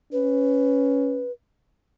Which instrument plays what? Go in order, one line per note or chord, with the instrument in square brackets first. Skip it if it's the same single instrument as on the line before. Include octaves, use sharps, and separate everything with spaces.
[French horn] C#4 [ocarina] B4